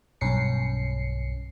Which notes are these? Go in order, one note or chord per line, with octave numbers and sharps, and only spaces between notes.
B1 G2 C#4 C7 C#7